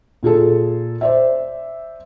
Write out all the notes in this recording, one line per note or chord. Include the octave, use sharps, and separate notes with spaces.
A#2 F4 G#4 A4
C5 D5 E5